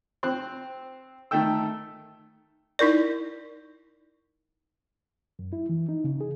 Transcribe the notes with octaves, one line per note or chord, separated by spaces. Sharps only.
C4 F#6
D#3 A3 A4 G5 E6
D#4 E4 A#4 D5
F#2
E4
E3
D#4
C#3
G#4